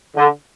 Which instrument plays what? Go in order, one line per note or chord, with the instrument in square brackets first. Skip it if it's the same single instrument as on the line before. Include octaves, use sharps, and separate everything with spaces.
[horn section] D3